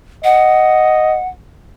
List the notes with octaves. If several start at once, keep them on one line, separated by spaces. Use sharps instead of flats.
D#5 F#5